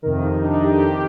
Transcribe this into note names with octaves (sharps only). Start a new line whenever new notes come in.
F2 C3 D#3 A#4
D#4
D4
D#4
G4
A4
C3 D#3 G4